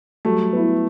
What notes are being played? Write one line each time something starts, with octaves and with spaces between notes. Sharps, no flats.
F#3 G3 A3
B3 E4